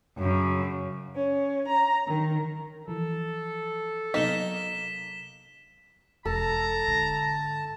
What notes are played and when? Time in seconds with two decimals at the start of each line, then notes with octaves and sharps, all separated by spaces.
0.18 F#2 C#3
1.14 C#4
1.67 A#5
2.07 D#3
2.88 E3 F3 A4
4.14 C3 F#3 A#3 B3 D#4 B6 E7 G7
6.25 E1 A4 A5 A#5
6.87 G#2 D3